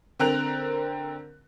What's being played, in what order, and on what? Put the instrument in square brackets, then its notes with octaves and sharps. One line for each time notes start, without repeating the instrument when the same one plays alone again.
[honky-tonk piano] D3 C4 A#4 F#6 F7